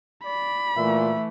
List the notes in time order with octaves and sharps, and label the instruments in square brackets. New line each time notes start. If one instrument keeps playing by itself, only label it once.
[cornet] D5 [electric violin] B5
[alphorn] A#2 [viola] E3 A3 [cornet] E5